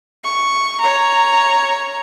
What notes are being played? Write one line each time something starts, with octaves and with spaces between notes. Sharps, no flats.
C#6
C#5 A#5